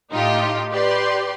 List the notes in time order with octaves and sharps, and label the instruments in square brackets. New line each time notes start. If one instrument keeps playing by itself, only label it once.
[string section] A2 D#4 F4 G4
G4 B4 D5 C6